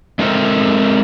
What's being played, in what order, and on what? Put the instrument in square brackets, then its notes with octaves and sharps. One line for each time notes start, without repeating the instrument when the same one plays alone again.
[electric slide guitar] G#3 C4 A4 A#4 C5 E5